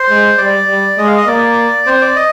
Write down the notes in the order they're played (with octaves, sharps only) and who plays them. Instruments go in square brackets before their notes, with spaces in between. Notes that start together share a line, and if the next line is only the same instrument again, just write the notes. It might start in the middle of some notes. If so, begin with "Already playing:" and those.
Already playing: [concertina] C5
[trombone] G#3
[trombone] G3 [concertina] D5
[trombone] G3
[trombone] G#3 [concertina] D#5
[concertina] F5
D#5
[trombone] A#3 [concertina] D5
[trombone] C4 [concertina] C5
[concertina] D5
D#5